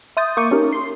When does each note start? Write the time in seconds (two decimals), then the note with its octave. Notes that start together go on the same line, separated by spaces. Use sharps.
0.17 E5 C6 D#6 G6 A6
0.37 A#3 C#6 D6 G6 D#7
0.51 C#4 D#4 G4 A#4
0.72 C6